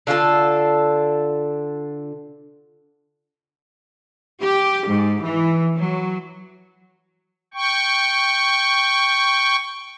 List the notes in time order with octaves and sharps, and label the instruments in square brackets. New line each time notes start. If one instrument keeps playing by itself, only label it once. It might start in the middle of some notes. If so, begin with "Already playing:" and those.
[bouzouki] D3 F4 F#4 A4
[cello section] G4
G#2
E3
F#3
[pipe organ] G5 C#6